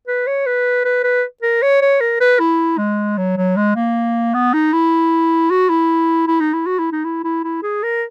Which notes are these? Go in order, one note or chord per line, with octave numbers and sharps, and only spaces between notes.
B4
C#5
B4
B4
B4
A#4
C#5
C#5
A#4
B4
E4
G#3
F#3
F#3
G#3
A#3
B3
D#4
E4
F#4
E4
E4
D#4
E4
F#4
E4
D#4
E4
E4
E4
G#4
A#4